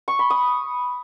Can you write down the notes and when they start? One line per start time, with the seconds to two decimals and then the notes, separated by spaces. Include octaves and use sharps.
0.08 C#6
0.19 B5
0.30 D#6